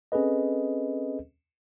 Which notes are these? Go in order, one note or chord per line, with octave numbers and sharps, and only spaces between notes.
C4 C#4 G#4 A4 B4 D#5